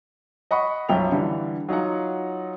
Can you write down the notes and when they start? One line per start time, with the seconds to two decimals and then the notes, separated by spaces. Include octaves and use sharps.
0.51 D#5 F#5 B5 C#6
0.89 B1 F#2 F3 C#5 G5 F7
1.12 D3 E3 G3
1.69 F#3 D#4 F4 F#5